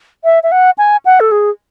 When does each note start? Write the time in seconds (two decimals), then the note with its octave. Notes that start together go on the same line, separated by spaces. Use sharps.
0.24 E5
0.43 E5
0.52 F#5
0.78 G#5
1.05 F#5
1.20 A4
1.31 G#4